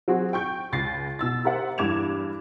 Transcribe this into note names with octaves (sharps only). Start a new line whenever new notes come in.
F#3 C4 F#4 G#4
G5 C#6 G6
C#2 A6 A#6 C7
B2 E6 A6
G4 A#4 C5 E5 F#5
E2 G2 D6 G#6 E7 F7